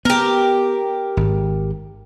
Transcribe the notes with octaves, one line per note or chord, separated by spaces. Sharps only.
B3 G4 A#4
G#1 G#2